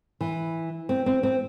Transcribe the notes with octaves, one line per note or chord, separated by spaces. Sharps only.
E3
C4
C4
C4